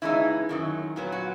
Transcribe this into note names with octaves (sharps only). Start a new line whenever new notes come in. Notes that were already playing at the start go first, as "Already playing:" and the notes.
C#3 E3 G#3 D#4 E4
F#2 D#3 F#3
A#2 F#3 B3
F#4